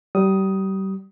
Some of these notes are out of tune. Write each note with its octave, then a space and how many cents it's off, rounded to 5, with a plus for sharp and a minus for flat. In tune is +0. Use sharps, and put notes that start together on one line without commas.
G3 -30 D#6 +10